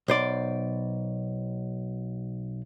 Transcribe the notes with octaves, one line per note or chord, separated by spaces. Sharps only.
B1 C5 D5